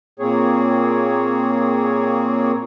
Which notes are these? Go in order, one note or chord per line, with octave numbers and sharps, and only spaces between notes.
A#2 A#3 C4 G#4 C#5